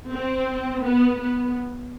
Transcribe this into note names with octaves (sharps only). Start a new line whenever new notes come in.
C4
B3
B3